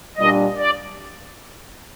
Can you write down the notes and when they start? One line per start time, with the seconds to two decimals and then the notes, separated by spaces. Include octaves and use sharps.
0.17 A#2 G3 D4 D#5
0.58 D5